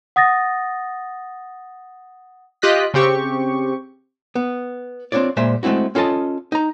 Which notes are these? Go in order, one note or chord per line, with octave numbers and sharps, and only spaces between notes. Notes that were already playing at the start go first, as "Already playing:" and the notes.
F#5 D#6 A6 A#6
F4 G4 D#5 F#6 B6
C#3 C4 G4 C#6
B3
C4 D4 F4 C#5 D5
A#2 G#3 C5 E5
G#3 A3 C4 E4 F#4
C#4 F4 A4 D#5 A5
D#4 A#5